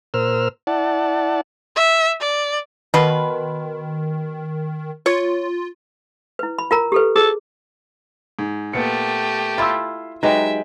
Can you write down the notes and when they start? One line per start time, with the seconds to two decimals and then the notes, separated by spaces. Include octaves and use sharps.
0.14 A#2 A#4 C5 E6 F6
0.67 E4 D5 F#5 A5
1.76 E5
2.21 D5
2.94 B2 D#3 B4 C6
5.06 F4 C#5
6.39 E4 B4
6.59 B5
6.71 F4 A#4 A#5
6.92 G4 A4 B4
7.16 G#4 A4
8.39 G#2
8.73 A#2 A3 B3 G4 C#7
9.58 E4 F4 B5 C6 E6
10.23 F#3 G#3 D#4 G4 B4 E5 G5